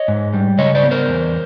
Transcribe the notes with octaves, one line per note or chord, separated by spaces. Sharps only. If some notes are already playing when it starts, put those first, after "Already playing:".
Already playing: C#5 D#5
G#2
G3
C#3 C#5 D#5
C5 D5
B3
A#4 C5
E2